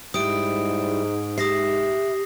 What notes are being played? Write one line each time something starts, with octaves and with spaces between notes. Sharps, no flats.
G#2 G3 E4 D#6 D7
G4 E5 D#6 A#6 C7